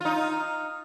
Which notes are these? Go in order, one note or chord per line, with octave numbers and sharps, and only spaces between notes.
D#4 F4